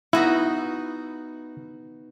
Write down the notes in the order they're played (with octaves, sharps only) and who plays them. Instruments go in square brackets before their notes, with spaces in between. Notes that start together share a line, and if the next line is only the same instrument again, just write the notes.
[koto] B3 D#4 F#4 [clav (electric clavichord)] E4